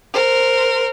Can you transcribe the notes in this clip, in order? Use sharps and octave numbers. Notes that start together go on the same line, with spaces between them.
A#4 C5